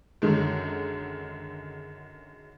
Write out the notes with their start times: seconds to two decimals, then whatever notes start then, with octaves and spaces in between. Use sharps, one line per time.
0.22 F#2 D3 D#3 G#3